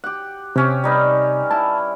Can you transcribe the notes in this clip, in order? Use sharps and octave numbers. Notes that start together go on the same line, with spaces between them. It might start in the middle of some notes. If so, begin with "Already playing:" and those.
G4 F#5
C3 C4 C#4 G4
G3 D#4 B4
E4 A5